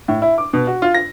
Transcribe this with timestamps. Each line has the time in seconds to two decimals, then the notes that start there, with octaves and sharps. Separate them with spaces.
0.08 A2
0.22 E4
0.38 D6
0.53 B2
0.67 F#4
0.82 F4
0.94 A#6